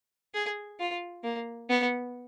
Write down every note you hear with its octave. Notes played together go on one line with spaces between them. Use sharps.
G#4
F4
A#3
B3